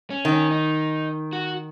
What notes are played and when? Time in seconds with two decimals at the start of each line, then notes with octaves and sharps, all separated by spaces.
0.10 C#4
0.25 D#3
0.32 C#4
0.51 D#4
1.33 F#4